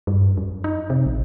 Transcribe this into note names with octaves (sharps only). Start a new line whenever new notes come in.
G2
F#2
D#4
C3
A#1